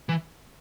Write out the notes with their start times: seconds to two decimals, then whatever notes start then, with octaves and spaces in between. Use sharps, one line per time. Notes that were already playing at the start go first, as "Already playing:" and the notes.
0.09 E3